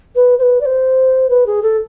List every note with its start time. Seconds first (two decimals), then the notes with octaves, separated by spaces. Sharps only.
0.15 B4
0.39 C5
0.42 B4
0.61 D5
0.66 C5
1.29 B4
1.46 G#4
1.63 A4